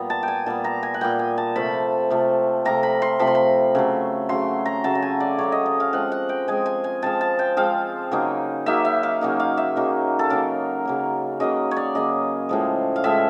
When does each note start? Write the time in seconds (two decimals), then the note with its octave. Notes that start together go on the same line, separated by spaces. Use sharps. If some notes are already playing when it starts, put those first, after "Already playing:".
Already playing: A#2 G3 B3
0.10 A5
0.23 G5 G#5
0.46 A#2 G3 B3 A5
0.64 A#5
0.83 G#5
0.94 F#5
1.01 A#2 G3 B3 G5
1.19 G#5
1.38 A5
1.56 C3 F3 A3 B5
2.10 C3 F3 A3
2.65 C3 F3 A3 A#5
2.83 B5
3.02 C6
3.19 C3 F3 A3 B5
3.27 C6
3.35 B5
3.75 C#3 F#3 A3
4.29 C#3 F#3 A3 C6
4.65 A#5
4.84 C#3 F#3 A3 A5
4.95 A5
5.02 G#5
5.20 D5
5.39 C#3 F#3 A3 C#5
5.52 D#5
5.66 D#5
5.80 F5
5.93 F3 G#3 C4 F#5
6.12 F#5
6.29 G5
6.48 F3 G#3 C4 G#5
6.66 G#5
6.84 G#5
7.02 F3 G#3 C4 A5
7.21 A5
7.39 G5
7.57 F3 G#3 C4 F5
8.11 C#3 F#3 A#3 D#4
8.66 C#3 F#3 A#3 D#4 E5
8.85 E5
9.03 F5
9.21 C#3 F#3 A#3 D#4
9.40 F5
9.57 E5
9.76 C#3 F#3 A#3 D#4
10.19 A4
10.30 C#3 F#3 A#3 A#4
10.85 C#3 F#3 A#3
11.40 C#3 F#3 A#3 D#5
11.71 C#5
11.76 D5
11.95 C#3 F#3 A#3 D#5
12.49 A2 F3 G#3
12.96 F5
13.04 A2 F3 G#3 E5